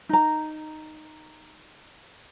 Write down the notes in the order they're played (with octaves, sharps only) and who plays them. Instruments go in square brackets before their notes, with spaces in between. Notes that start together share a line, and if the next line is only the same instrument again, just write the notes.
[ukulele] D#4 A#5